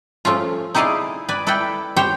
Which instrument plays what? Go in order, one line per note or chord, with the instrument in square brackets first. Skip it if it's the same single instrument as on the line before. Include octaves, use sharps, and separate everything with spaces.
[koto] F3 A3 C#4 F4
D#4 E4 G#4 D5 D#5 F5
B4 D5 G#5
E4 A4 B4 D5 G5
G4 C5 C#5 G5